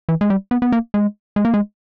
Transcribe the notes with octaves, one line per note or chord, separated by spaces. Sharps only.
E3
G#3
G3
B3
B3
A#3
G#3
G#3
A#3
G#3